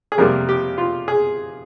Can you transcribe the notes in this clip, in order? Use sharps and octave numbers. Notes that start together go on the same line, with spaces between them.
G#4
F2 C3 G3 A#3 A#4
G4
F4
G#4